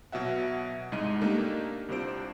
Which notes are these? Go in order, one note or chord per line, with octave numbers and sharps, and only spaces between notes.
B2 F#3 E5 F#5
C2 G#2 G#3 D#5 D#7
A3 A#3 D4 D#4 G4
C2 C3 D4 F4 C5 D7